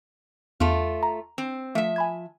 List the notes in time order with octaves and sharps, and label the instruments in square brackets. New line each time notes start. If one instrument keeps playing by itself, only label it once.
[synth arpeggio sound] E2 C6 [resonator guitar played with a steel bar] A3 F4
[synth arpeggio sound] A#5
[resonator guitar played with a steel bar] C4
[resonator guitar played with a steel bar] F3 E5 [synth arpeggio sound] A3
[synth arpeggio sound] G#5 B5 G#6